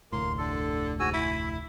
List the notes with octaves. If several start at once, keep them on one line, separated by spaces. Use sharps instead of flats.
F1 D2 A2 A#3 C6
D3 A4
G#2 F#4 G#5 E6
E4 E5